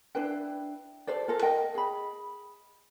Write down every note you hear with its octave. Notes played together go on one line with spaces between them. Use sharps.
D4 E4 B4 G5
G4 A4 C5 D5
F4 A4 A#4
A#4 D#5 G5
G#4 B5